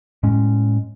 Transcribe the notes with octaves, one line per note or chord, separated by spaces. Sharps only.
A2 G#3 C#4